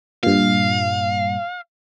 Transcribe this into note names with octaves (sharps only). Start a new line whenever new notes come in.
G2 A#2 F5